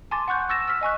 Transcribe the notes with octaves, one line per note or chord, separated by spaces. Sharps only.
G#5 A5 C6 D6 A6
F#5 C#6 F#6 G6
C#6 E6 A6 A#6 E7
E6 F6 B6
D#5 G#5 C#6 F#6